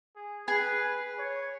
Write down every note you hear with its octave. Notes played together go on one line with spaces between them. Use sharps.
G#4
G#4 B4
C#5